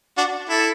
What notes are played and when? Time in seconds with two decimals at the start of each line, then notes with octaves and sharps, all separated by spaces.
0.17 D4 F#4
0.49 E4 A4